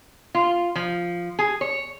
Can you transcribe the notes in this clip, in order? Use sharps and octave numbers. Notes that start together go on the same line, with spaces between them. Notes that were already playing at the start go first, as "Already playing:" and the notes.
F4
F3
G#4
C#5